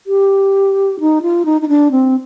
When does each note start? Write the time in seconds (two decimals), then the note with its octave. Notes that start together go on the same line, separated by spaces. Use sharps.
0.07 G4
1.00 D#4
1.22 F4
1.45 D#4
1.61 D#4
1.68 D4
1.91 C4